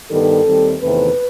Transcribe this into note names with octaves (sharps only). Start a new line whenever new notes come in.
G2 D#3 G3 B3 A4
D#2 D#3 G3 C4
E2 C3 D#3 A3 C4 B4